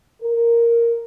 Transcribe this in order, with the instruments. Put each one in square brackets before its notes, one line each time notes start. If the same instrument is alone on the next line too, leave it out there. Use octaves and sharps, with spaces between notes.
[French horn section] A#4